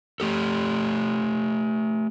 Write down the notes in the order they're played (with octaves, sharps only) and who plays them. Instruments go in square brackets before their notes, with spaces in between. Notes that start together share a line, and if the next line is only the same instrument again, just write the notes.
[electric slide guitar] A3 G4 A4